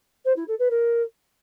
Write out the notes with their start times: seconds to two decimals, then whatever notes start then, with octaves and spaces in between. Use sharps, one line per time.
0.25 C5
0.36 E4
0.48 A4
0.59 B4
0.70 A#4